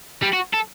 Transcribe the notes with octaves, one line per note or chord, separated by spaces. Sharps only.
G3
F#4
A4